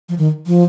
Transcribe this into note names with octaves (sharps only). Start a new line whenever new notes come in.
F3
D#3
F3